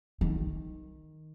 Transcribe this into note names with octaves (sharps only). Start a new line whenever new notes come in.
D#3